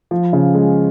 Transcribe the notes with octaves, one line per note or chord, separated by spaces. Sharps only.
F3
C#3
G#3